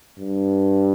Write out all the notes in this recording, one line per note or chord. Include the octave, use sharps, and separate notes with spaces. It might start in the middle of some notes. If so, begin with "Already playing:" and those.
G2